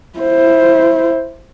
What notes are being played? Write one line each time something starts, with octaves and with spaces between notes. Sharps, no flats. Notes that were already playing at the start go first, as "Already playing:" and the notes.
E4 C5